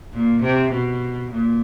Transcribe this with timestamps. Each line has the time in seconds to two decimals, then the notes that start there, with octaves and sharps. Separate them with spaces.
0.13 A#2
0.42 C3
0.71 B2
1.32 A#2